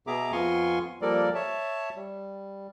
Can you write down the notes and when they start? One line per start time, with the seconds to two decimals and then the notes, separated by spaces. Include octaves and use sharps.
0.07 B2 B3 G#4 E5 A#5 D6
0.32 F2 B3 F4 G#5 C6 C#6
1.02 F3 G3 A#3 A4 A#4 D5
1.35 C#5 E5 A5
1.96 G3